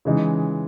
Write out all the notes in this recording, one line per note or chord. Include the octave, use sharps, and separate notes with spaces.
C#3 E3 G#3 D#4